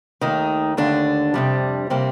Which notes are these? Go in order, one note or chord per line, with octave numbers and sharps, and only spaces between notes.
D#2 D#3 A3 D#4
D#2 D3 A3 D4
F2 C3 G3
C3 G3 A#3 C4